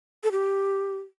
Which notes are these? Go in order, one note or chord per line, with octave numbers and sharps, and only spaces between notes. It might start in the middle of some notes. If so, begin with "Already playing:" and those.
A4
G4